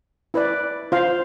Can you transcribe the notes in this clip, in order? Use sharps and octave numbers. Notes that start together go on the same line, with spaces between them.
E4 B4 D5
F4 C5 F5